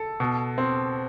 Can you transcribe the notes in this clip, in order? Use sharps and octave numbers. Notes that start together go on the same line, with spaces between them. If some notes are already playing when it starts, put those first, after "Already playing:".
Already playing: A4
B2
C4